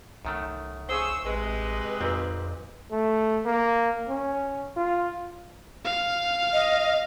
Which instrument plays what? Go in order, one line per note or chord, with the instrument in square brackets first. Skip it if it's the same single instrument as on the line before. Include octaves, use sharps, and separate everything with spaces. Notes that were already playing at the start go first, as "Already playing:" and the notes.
[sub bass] C2 [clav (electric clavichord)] F#2 D#3 A3
[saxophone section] C#3 G#4 C5 [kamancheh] C#6 E6
[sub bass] A1 [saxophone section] C3 G#3 [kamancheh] B4 D#5
[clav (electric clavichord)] G#1 A#2 C4 [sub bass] F2
[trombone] A3
A#3
C#4
F4
[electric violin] F5
[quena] D#5